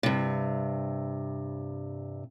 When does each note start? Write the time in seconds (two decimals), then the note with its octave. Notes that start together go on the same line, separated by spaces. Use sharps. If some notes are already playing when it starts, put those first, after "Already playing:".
0.03 G2 C3